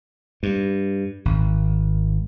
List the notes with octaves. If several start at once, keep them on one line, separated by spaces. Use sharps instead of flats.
G2
G#1